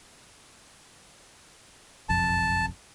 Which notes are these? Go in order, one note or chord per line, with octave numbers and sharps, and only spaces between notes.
F#1 B1 F2 A5